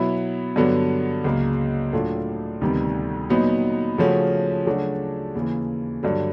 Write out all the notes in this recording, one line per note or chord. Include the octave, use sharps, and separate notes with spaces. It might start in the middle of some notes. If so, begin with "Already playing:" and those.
Already playing: B2 F#3 B3 E4
G2 D3 F#3 B3
C#2 C#3 F#3 A#3
A2 F#3 A3 D4 F4
D2 C3 D#3 G3 B3
A#2 F#3 B3 D#4
C#3 F3 A3 C#4 F#4
C#3 F#3 A3 D4 F#4
D#2 C#3 E3
G2 D3 F#3